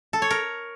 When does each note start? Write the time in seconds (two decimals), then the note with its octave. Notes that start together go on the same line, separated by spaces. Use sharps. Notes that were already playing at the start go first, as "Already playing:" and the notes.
0.13 A4
0.22 C#5
0.31 A#4